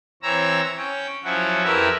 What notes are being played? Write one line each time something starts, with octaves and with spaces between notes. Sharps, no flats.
E3 C4 C#5 A#5 E6
C#4 G5
F3 F#3 C#4 E4 F#4
F2 E4 G4 A#4 B4 E5